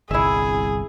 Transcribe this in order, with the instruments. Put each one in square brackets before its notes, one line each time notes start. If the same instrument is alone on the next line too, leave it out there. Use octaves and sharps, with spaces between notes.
[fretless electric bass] G1 C2 [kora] E4 E5 [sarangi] G#4